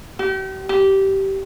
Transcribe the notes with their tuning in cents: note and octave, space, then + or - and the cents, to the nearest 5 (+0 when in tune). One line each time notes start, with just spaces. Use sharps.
G4 -40
G4 -15